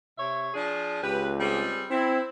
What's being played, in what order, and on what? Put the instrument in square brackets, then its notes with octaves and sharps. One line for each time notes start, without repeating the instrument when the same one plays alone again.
[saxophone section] C3 C#5 E5
F3 D4 G#4
[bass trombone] C#2 [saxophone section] G4 B4
[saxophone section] G3 C4 G#4
[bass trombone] C4 [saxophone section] E4